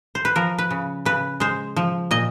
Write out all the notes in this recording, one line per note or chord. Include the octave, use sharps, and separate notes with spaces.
C5
B4
F3 A#4
B4
C#3
C#3 B4
G#3 C5
F3
A#2 D#5